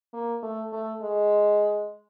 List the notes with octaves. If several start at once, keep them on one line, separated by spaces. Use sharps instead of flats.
A#3
A3
A3
G#3